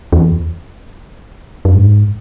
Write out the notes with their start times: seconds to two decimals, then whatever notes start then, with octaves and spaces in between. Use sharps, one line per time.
0.12 E2
1.65 F#2
1.76 G#2